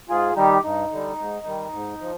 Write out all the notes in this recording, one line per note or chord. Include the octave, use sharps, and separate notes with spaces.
G#2 F4 G#4
D#3 G3 D#4 G4
G2 D#4
D3 G3
G#2
D#3 G3
G#2
F3